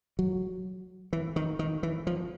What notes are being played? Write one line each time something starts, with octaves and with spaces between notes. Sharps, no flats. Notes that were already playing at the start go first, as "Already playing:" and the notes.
F#3
E3
D#3
D#3
E3
F3